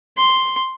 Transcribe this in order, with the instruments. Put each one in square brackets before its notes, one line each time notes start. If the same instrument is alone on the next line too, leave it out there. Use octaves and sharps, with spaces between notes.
[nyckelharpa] C6